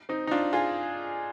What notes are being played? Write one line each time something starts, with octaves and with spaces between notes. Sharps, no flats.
C4 D#4
D#4
D4 F4
F4 G#4